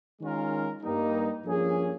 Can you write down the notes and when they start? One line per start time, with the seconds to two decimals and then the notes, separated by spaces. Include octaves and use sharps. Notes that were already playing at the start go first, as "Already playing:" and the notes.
0.21 D#3 G#3 C#4 F4 A#4
0.83 G2 G3 A#3 D#4
1.45 G2 F3 A#3 C#4 G#4